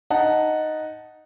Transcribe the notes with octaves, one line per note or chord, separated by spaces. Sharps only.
D#4 F#5 A5